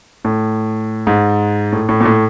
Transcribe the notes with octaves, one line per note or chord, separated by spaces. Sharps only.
A2
G#2
A2
A2
A#2
A2